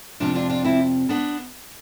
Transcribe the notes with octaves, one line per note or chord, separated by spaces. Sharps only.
F2 C3 F3 D4 F4
D4 F4
D4 F4
C4 E4
B3 D4